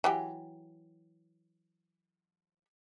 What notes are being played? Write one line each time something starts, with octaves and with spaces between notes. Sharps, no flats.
E3 F#3 G4